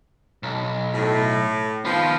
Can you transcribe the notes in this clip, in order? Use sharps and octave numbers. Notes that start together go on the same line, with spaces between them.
B1
A2
D#3 F3 B3